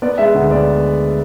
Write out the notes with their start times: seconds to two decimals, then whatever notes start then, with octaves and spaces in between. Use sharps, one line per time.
0.02 B3 D5
0.18 G#3 E5
0.34 D2 F#5
0.51 B3 D5